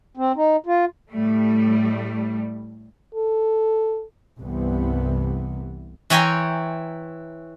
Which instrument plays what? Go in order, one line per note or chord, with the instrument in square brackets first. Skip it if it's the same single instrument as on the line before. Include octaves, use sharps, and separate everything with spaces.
[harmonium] C4
D#4
F4
[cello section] A2 G3 A3
[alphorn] A4
[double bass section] C2 G2 C3 E3 B3
[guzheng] E3 C#5 G5 G#5 A#5 C6